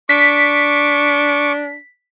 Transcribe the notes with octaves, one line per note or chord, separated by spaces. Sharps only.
D4 C#6 D6 B6